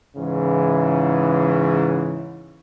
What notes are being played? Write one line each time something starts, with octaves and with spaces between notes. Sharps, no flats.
G#2 C#3 E3